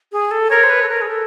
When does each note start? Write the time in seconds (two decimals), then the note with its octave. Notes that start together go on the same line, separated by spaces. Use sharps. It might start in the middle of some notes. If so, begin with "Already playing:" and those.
0.12 G#4
0.31 A4
0.50 A#4 C#5
0.63 C5
0.70 B4
0.83 A4
0.89 A#4
1.01 G#4
1.07 A4